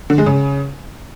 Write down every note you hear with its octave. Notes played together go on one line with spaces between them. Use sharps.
D3
G#3
C#3